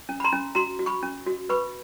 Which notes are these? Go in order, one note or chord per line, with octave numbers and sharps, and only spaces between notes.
C#4
B5
A#5 C6
C#4
F#4 A#5 C6
F#4
B5 C#6
C#4
F#4
B4 B5 C#6